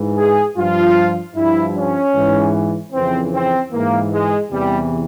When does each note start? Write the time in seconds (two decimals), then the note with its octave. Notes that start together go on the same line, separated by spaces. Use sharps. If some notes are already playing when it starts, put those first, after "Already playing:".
Already playing: G#2 E3
0.17 G#4
0.56 G2 F3 F4
1.35 G2 F3 E4
1.75 C#4
2.15 G#2 E3
2.93 F2 C#3 E3 C4
3.33 C4
3.72 G#2 E3 A#3
4.12 G#3
4.51 E2 C3 E3 G3